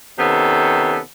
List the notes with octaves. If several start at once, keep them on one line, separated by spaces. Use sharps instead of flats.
C3 D#3 B3 C#4 A4